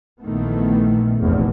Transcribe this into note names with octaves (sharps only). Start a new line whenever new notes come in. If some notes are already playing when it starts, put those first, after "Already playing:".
A#1 A#2 D#3 E3 A3 B3
F1 A#1 E2